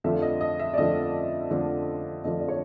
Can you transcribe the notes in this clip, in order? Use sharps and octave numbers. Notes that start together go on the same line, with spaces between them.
F2 D3 F3 A3 D4 E5
D#5
D#5
E5
D5
F2 D3 F3 A3 D4 D#5
F2 D3 F3 A3 D4
F2 D3 F3 A3 D4 D#5
D5
C#5